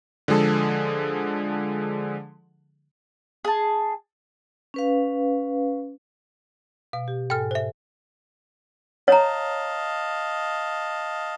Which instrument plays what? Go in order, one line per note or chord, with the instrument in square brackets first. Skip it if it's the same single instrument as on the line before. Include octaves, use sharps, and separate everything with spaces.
[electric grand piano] D3 F3 G#3 G#4 A4
[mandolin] G#4 A5
[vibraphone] C#4 B4 F5
[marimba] B2 [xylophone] F5
[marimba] G4
[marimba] G#2 A4 G#5 [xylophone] G5 F6
[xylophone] C5 E5
[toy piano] C#5 A#5 [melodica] D#5 F5 A5